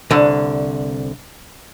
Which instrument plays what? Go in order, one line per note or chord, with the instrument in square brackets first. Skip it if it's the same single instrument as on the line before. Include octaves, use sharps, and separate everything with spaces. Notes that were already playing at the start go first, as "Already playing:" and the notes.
[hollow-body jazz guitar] C2 D3